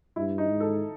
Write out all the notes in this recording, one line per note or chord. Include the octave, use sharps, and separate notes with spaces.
G2 E4
D#4
G#2
A4